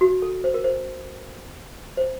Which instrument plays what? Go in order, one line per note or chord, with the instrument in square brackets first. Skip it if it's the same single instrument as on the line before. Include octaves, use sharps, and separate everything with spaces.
[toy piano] F#4
A4
C5
A#4
C5
C5